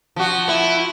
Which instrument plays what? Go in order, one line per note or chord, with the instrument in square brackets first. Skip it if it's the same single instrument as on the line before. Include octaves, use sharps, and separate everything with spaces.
[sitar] F3 F#4
[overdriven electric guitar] E4